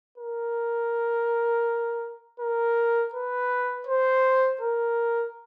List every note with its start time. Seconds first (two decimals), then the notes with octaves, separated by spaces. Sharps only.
0.18 A#4
2.40 A#4
3.14 B4
3.87 C5
4.61 A#4